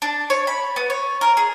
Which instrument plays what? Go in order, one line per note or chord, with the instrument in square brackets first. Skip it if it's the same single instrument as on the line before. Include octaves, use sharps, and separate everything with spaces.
[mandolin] D4
C#5
B5
B3
C#5
A#4
G#4